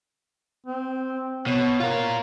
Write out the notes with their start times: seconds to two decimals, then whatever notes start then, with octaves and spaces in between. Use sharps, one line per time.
0.66 C4
1.47 B2 C#5
1.80 F4 A#4